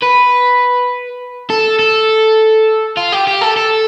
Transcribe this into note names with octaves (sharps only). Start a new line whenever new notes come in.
B4
A4
A4
F4
G4
G4
A4
A4